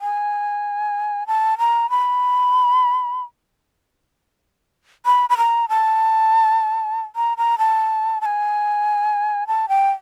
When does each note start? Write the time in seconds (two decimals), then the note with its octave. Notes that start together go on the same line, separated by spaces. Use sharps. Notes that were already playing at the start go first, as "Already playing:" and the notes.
0.01 G#5
1.27 A5
1.58 A#5
1.90 B5
5.06 B5
5.30 B5
5.37 A#5
5.69 A5
7.16 A#5
7.38 A#5
7.58 A5
8.21 A5
8.25 G#5
9.47 A5
9.69 G5